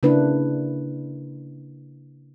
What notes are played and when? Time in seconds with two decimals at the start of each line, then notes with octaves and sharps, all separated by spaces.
0.03 C#3 A#3 D4 E4 B4